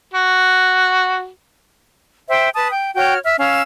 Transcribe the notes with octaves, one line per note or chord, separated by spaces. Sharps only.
F#4
C5 E5 G5
B4 A5 D#6
G5
F#4 C#5 G5 F6
E5 F6
C#4 F5 E6